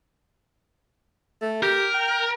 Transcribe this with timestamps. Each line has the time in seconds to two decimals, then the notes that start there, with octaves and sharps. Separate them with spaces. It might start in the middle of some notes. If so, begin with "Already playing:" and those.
1.42 A3
1.63 G4 A#4
1.94 G5